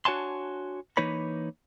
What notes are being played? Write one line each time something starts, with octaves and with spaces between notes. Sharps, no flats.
D4 F#4 C#5 G#5 A5 C6
E3 A#3 D#4 B4 C#5 B5